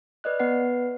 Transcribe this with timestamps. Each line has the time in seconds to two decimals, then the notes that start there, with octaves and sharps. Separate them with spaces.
0.24 B4 D5 D#5 F#6
0.39 B3 B4 F#5 C7